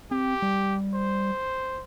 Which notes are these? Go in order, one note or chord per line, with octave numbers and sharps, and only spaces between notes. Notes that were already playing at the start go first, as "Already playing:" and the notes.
C4 G4
G3
C5